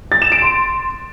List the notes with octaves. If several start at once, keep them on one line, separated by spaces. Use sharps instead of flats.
A6
E7
D7
C6